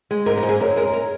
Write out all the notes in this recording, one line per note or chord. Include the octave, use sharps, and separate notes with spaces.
G#3
G#2 A#4
A#4
G#2
G#4
F#2 A#4
G#3 A#4
A#4